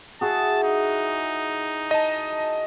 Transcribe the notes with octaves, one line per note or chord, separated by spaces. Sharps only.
E4 F#4 G#4 A5
D#4
D#5 A5